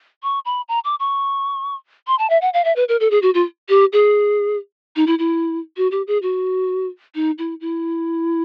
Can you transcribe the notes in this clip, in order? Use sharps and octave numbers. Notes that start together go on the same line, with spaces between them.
C#6
B5
A#5
D6
C#6
C6
A5
E5
F#5
F5
E5
B4
A#4
A4
G#4
F#4
F4
G4
G#4
D#4
E4
E4
F#4
G4
G#4
F#4
D#4
E4
E4